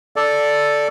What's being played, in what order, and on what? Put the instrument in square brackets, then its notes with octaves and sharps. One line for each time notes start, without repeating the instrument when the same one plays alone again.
[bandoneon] A4 D5